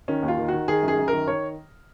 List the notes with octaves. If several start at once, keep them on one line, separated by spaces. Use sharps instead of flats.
D#3 C#4
D#2
F4
D#3
D#3 F#4
D#3 G#4
F#2
G#4
F#2
D#3 A#4
D#3 C#5